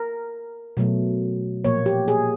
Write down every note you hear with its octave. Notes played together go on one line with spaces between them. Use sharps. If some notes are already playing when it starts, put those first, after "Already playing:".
Already playing: A#4
B2 F#3 A3
A#2 F3 A#3 C#5
G4
G#4